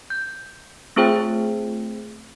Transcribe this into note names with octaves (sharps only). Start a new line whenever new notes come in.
G6
A3 C4 F4 G#4 C5 G5